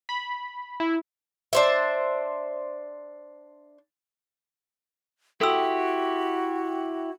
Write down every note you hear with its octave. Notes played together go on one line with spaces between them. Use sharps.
B5
E4
D4 C5 E5
E4 F#4 G4 A4 G5 C6 E6